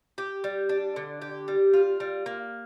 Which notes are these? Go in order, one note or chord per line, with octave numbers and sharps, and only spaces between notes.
G4
G3
D4
D3
G4
G3
F4
G3
A#3